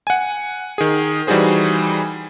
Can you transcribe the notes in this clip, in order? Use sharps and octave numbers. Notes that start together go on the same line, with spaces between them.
F#5 G#5
D#3 G#4
E3 G3 D#4 F#4 G#4 C5